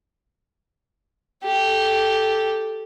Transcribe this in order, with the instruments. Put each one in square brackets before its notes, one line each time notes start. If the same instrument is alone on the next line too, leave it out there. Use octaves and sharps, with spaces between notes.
[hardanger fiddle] G4 A4